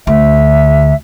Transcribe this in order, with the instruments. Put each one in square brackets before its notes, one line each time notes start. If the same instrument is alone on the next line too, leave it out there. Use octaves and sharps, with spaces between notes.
[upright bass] D2 [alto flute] E5